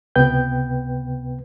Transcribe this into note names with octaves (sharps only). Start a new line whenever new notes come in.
C#2 C3 B3 B4 G5 G6